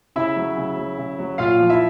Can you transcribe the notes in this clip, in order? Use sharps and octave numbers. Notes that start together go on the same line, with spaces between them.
C#3 E4 E5
F#3
C#3
F#3
C#3
F#3
A#2 F4 F5
F3
E4 E5